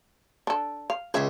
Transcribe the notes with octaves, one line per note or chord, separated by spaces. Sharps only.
D4 A4
F5
C#2 G#4 E5